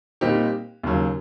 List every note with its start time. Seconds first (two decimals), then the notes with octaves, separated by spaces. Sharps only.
0.21 A#2 G3 C4 D#4 G4
0.84 D#2 C#3 F#3